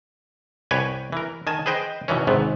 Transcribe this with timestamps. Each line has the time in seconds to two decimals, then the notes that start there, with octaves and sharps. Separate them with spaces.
0.71 C2 G4 B4 C#5 G#5
1.12 E3 A#4
1.47 D#3 G#5 A5
1.66 G#4 B4 C5 D#5 G5
2.08 B2 D#3 E3 C#4
2.27 G#1 G#2 C3 B3